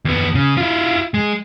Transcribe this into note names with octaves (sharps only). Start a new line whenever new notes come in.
D#2 B3
C#3
E4 F4
G#3